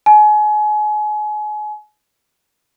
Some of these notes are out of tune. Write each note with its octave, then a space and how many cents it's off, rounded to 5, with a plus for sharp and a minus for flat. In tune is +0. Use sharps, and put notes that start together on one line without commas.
G#5 +30